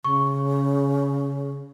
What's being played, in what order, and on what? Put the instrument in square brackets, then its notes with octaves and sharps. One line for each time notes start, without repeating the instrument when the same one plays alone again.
[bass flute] C#3 [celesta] C#6